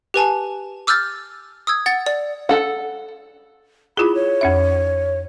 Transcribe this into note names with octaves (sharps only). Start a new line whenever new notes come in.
G4 B4 G#5 A5
D6 E6 F6 G6 A6
D#6 E6 G#6
F#5 A6
D5
A4 F#5
E4 F4 G#4 B5
C#5
F2 C#4 E5